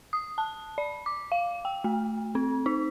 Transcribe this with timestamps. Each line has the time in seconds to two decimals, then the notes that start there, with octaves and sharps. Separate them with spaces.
0.13 D#6
0.38 A5
0.78 D5
1.06 D6
1.32 F5
1.65 G5
1.84 A3
2.35 C4
2.66 D#4